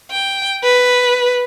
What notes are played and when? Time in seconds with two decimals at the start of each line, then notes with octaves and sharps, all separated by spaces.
0.11 G5
0.64 B4